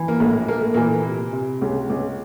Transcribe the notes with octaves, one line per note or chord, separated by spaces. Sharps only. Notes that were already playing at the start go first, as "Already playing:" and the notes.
Already playing: E3
A#3
A#1 A2 A3
A#1 A#3
A3
A#2 E3 A#3
C3
C3
C#2
C#2